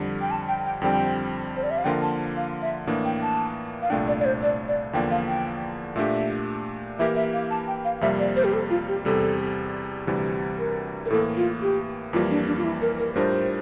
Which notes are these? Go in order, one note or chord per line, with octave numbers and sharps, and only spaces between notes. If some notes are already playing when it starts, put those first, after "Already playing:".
Already playing: F2 D3 G3
G5
A5
G5
G5
F2 D3 G3 C4 G5
C5
D5
E5
F5
D3 F3 A#3 F4 A#4 G5
A5
F5
E5
A2 E3 A#3 D4
G5
A5
F5
C2 A#2 A3 D4 G5
D5
D5
C5
D5
D5
E2 D3 F3 A#3 D4 G5
F5
G5
A#2 A3 D4 G4 E5
E3 A#3 E4 G4 A#4 E5
E5
F5
A5
G5
F5
F2 C3 G3 A#3 E5
D5
C5
G4
A4
F4
G4
E2 C3 G3 A4
D2 C3 E3 G3
A#4
A#4
A2 E3 A#3 A4
F4
G4
F2 E3 G3 A#3 F4
D4
D4
F4
E4
A#4
A#4
A2 G3 D4 F4 A#4 C5